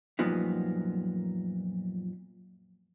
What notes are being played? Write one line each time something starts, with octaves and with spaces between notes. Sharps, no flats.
F#2 A#2 F3 G3 B3 D#4